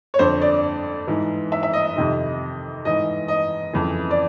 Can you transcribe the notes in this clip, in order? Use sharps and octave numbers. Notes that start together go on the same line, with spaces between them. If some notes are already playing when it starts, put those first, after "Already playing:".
C#5
F2 D3 C5
D5
G#2 E3
E5
E5
D#5
D#5
F2 C3 D#3 D#5
G#2 E3 D#5
D#5
F2 C#3 E3
D5